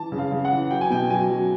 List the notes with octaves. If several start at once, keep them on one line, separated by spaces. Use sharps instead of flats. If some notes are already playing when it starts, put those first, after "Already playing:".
Already playing: E3 A5
C#3
F5
C#3
F#5
E3
F#3 G5
G#5
B2 G5
F#3 G#5
F#3